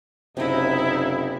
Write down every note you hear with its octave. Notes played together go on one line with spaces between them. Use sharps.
F#1 C3 D#4 E4 D#5